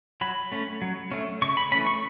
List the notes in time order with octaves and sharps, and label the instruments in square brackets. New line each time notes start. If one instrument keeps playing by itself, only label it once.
[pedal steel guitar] F#3 B5
A3 C#4
F#3
A3 C#4
C#3 C#6
B5
E3 A3 C#4 B5
C#6